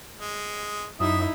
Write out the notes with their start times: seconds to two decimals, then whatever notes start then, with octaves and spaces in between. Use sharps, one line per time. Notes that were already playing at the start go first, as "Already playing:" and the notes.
0.20 G#3
1.00 F#2 D#4 E4 E5 D#6